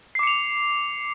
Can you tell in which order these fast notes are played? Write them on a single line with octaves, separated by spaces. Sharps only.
C7 D6 C#7 F7